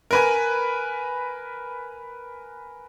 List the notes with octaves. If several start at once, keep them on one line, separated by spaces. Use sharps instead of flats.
A#4 B4 G#5